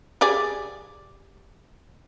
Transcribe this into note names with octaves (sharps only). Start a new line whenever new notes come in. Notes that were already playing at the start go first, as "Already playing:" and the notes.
G4 G#4 D5